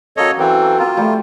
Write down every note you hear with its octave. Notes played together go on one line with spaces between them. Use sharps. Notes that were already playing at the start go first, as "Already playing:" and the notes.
F#3 A#3 C#4 A4 C#5 D#5
E3 A#3 C4 A4
A#3 C4 F4
F3 G3 A3 A4